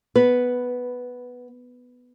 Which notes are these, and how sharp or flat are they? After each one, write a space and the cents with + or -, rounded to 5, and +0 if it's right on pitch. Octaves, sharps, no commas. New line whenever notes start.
B3 +0 B4 +0